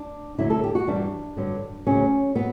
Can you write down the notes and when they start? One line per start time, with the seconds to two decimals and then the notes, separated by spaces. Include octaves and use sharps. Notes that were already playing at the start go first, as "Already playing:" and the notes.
Already playing: D4
0.38 D2 D3 F#3 E4
0.50 A4
0.64 G4
0.75 F#4
0.87 F#2 E3 G3 D4
1.37 G2 D3 F#3
1.87 D2 C#3 F#3 C#4
2.36 F#3 B3